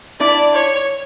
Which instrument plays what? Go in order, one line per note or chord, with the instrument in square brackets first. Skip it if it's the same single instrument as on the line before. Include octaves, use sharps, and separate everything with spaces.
[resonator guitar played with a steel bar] D4 E4 [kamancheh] D5
[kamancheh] C#5